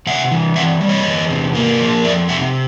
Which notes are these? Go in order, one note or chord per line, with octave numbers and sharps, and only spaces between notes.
C3 E5 F#5
E3
C4 E5 F#5
G3
C#5 D#5
E2
C3
A#3
F3
F2 D5 E5
C3 E5 F#5